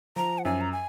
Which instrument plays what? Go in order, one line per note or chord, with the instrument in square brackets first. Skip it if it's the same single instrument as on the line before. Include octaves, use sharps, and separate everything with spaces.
[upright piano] F3 [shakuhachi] A#5
[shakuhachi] F#5
[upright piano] F#2 [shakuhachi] G#5
[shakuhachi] A#5
G#5